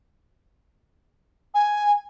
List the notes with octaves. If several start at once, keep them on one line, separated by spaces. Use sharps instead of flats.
G#5